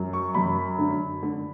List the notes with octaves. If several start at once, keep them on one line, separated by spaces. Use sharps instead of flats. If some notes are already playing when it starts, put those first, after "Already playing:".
Already playing: F#2
C#6
F#2 B5
D3
D3